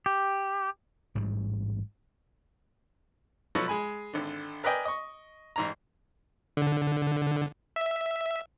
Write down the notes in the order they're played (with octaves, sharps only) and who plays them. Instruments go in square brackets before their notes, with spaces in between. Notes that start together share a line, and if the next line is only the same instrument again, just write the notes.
[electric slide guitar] G4
[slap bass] A1 G#2 G3
[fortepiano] B2 F3 F#3 B3 A4 C#6
G#3 G#5 B5
G#1 D3
A#4 B4 D5 D#5 G5 G#5
D#5 C#6
A1 G#2 A#5
[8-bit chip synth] D3
E5